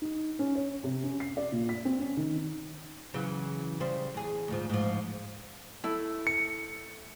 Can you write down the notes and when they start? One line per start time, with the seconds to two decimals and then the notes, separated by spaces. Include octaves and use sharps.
0.02 D#4
0.39 C#4
0.55 C#5
0.84 C3
1.04 C#4
1.20 C7
1.37 D5
1.52 A#2
1.69 B6
1.85 C4
2.00 C#4
2.17 D#3
3.14 C#3 E3 F#3
3.80 C#3 G3 C5
4.14 E2 G#4
4.48 D2 G#2 F3
4.70 G#2 F3
5.84 A3 E4
6.27 C#7